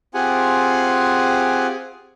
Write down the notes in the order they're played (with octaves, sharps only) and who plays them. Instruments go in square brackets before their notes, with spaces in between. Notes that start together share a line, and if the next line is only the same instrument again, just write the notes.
[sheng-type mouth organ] C4 F4 G4 G#4 F#5 G#5